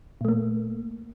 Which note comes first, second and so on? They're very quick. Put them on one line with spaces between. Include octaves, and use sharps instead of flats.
A#2 A3 A#3